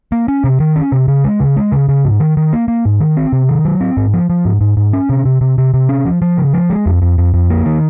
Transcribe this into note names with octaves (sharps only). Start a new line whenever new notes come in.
A#3
C#4
C3
D#3
C#4
C3
C#3
G#3
C#3
G#3
C#3
C#3
G#2
D#3
D#3
A#3
A#3
G#2
D#3
C4
C3
D#3
F#3
C4
G#2
F3
F3
G#2
G#2
G#2
C#4
C3
C3
C3
C3
C3
C#4
F3
F3
C#3
F3
G#3
F2
F2
F2
F2
A#3
D#3